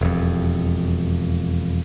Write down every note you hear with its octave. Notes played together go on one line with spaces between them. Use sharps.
E1 F2